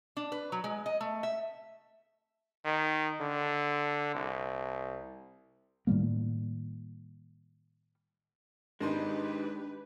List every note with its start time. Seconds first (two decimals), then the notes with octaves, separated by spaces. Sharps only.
0.17 D4
0.32 B4
0.52 F#3
0.64 G#3
0.86 D#5
1.01 A3
1.23 E5
2.65 D#3
3.21 D3
4.15 C2
5.87 A2 D#3 G3 A#3
8.80 G#1 D#3 G#3 D4 D#4 G4 B4 C6